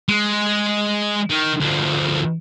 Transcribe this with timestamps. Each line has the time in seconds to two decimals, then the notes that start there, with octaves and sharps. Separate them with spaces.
0.09 G#3
1.30 D#3
1.60 D2 F3